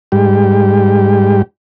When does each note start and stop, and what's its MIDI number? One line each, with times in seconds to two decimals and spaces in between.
0.12 1.42 44
0.12 1.42 55
0.12 1.42 67